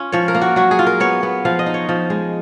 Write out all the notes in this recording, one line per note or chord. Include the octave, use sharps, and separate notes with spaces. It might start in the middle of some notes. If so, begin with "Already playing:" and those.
Already playing: C#4 F4
F3 C#5
A#4
A#3
F#4
F#3 F#4
G#4
F4
A#4
B3 C#5
B3
F3 F5
D#5
D#4
C#5
F3
G#3